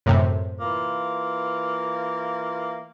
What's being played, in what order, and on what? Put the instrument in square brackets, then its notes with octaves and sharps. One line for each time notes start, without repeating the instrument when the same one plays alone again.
[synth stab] F#2 A2 C3
[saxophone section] E3 A#3 F4